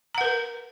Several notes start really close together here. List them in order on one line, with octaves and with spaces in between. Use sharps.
A#5 F#5 B4 A#4